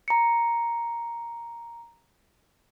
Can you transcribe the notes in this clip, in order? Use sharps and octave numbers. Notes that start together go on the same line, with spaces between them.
A#5 C#7